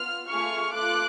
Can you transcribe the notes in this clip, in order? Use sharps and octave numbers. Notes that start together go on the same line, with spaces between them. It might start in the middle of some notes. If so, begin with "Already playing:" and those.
Already playing: B3 F4 F6
A3 F4 G#4 C#6 F6
A3 F4 A4 D6 F#6